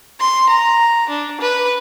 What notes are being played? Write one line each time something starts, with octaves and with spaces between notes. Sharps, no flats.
C6
A#5
D4
B4